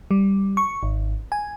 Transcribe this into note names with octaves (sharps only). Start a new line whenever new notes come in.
G3
C#6
G#1
G#5